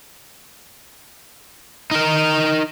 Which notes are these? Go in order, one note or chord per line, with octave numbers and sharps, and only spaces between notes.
D#4 A#4